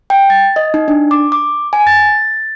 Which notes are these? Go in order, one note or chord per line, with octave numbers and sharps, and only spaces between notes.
G5
A6
D#5
D#4
D4
D6
D6
G#5
A6